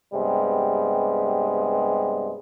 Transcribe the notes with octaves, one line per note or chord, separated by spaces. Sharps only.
G2 C3 G3 G#3 B3